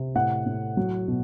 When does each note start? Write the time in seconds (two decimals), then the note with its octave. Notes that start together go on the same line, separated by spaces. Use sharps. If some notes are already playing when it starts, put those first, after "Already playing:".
Already playing: C3
0.15 A2 F#5
0.46 A2
0.77 F#3
1.08 B2